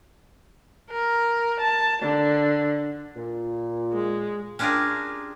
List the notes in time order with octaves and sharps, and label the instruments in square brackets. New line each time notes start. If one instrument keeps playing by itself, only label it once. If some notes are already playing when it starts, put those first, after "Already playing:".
[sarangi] A#4
A5
D3
[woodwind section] A#2
[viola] G#3
[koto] C#4 D4 F4 G4 G#4 A#4